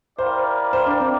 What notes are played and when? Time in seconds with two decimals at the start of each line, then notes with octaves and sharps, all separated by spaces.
0.19 E4 G4 A#4 C5 D5 F5
0.73 C5
0.86 D4
1.01 C4